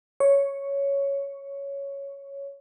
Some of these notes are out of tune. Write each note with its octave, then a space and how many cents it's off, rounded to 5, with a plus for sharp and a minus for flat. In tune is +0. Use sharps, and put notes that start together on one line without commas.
C#5 +5